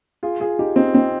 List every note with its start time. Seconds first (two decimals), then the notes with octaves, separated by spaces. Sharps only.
0.23 F4 G#4
0.40 F4 G#4
0.59 D#4 G4
0.76 C4 D#4
0.94 C4 D#4